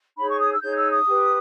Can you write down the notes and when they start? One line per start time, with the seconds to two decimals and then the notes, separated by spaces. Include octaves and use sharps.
0.17 D#4 G#4 C#5 B5
0.29 C#6
0.39 D#6
0.51 E6
0.61 D#4 G#4 C#5 G6
0.77 E6
0.92 D#6
1.06 G4 B4